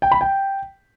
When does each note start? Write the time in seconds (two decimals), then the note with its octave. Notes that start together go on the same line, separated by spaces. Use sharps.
0.02 G5
0.11 B5
0.21 G5